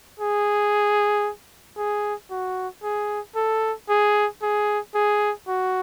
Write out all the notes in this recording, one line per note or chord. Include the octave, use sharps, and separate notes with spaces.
G#4
G#4
F#4
G#4
A4
G#4
G#4
G#4
F#4